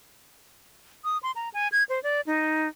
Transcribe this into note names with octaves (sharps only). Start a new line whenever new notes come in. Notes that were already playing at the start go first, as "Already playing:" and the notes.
D#6
C6
A#5
G#5
G#6
C5
D5
D#4